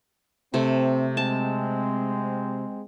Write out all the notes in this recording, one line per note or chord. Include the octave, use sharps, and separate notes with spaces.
C3 A3 C4
G#3 C4 A5